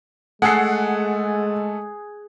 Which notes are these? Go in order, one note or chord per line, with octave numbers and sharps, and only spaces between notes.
G#3 A3 G#4 A4 F#5 F#6 C7